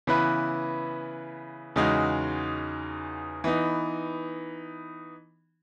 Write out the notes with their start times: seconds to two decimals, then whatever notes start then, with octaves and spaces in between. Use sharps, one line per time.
0.07 C#3 E3 B3 E4 B4
1.76 E2 C#3 G#3 D#4 F#4
3.44 E3 B3 D#4